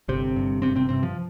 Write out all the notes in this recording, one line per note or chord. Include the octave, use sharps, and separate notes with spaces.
G1 C3 C4
G2
G#1 C3 C4
C3 C4
G2 C3 C4
F3